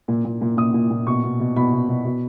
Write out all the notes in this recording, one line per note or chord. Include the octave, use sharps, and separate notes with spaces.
A#2
A#2
A#2
A#2 D#6
A#2
A#2
B2 C#6
B2
B2
B2 B5
B2
B2
B2